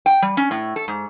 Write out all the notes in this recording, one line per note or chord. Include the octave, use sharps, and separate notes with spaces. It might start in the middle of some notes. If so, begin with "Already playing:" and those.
G5
G3
C#4
A2
A4
G#2